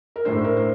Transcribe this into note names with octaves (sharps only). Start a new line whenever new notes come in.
A#4
A2 A3 D4 C5
A#4
C5